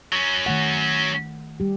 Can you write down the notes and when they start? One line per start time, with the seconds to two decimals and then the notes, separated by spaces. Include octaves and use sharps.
0.12 F#3 C#4
0.46 D#3 A3 F#5
1.60 G3 G4